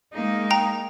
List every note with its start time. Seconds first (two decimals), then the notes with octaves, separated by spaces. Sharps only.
0.13 G#3 A#3 D#4
0.50 G5 A#5